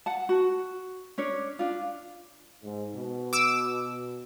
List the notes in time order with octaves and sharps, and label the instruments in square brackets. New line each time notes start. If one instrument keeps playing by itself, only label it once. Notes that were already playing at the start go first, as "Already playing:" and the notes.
[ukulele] F#5 A5
F#4
C#4 D4 C#5
D4 F4
[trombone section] G#2
B2
[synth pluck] D6 E6